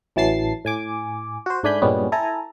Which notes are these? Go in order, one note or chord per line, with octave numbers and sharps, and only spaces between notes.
A1 E3 F#3 A5 A6 C7
A2 G#5 D6
F#4 C5
G#2 A3 D4 G#5 B5 G6
G2 A#2 G3 G#3 B3 C#4
E4 A4 G#5 A#5